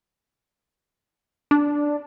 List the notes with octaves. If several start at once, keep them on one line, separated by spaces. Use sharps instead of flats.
D4